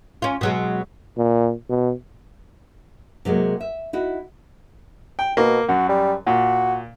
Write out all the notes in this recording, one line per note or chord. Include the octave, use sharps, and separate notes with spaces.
C#4 F4
B2 F#3 G#3
A#2
B2
C3 F#3 G#3 A#3
E5
D#4 E4 F#4
G5
B2 A#3
F#2 F#4
G3
A#2 F#4